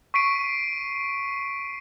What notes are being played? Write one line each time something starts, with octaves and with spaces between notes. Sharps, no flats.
C#6 B6 C7 D7 D#7